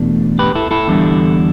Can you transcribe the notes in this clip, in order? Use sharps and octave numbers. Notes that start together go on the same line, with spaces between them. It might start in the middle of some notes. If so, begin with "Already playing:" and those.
Already playing: E2 B2 A3 D4
G4 B4
E4 A4
E4 A4
E2 D3 G3 D4